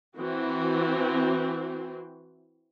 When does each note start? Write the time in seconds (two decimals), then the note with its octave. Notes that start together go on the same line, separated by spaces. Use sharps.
0.17 E3 C4 F#4